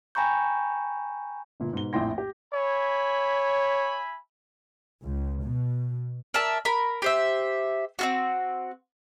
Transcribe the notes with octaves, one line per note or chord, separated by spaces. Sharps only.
G5 G#5 A#5 B5 C#6 G6
G1 A#2
G#2 B2 G7
A#1 F2 A2 G5 C6 A#6
G4
C#5 E5 G#5 B5
C#2
B2
A#4 D5 E5 A5
A#4 B5
G4 C5 E5
C4 F4 F#4